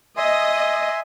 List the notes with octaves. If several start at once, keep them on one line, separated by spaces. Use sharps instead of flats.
D#5 E5 G#5 C6